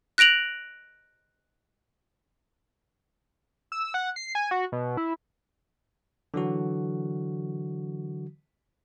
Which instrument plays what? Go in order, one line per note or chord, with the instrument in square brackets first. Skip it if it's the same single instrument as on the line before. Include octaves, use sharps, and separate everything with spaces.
[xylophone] F#6 A#6 D7 F7 F#7
[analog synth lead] E6
F#5
C7
G#5
F#4
B2
E4
[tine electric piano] D3 E3 F#3 F#4